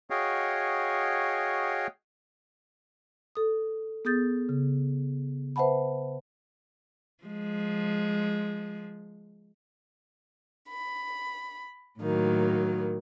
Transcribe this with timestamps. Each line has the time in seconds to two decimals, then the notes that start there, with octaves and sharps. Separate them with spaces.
0.10 F#4 G#4 C#5 D#5 F5 G5
3.35 A4 D#6
4.05 B3 G#4 D#6 G6 A6
4.49 C#3
5.56 B4 C5 E5 F#5 A5 B5
7.24 F3 G#3
10.70 B5
12.00 A2 D#3 F#3 A#3